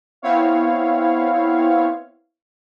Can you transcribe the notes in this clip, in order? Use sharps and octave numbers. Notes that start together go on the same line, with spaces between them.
B3 C4 E4 C#5 F5